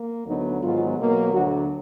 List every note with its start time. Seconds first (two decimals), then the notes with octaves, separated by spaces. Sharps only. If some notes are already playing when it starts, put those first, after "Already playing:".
Already playing: A#3
0.26 D2 D3 F#3 B3 D#4
0.62 G#2 D#3 F#3 B3 F4
0.97 B2 F#3 A#3
1.32 D2 D3 F#3 F#4